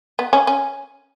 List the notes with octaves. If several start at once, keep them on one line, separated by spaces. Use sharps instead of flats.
B3
C#4
C#4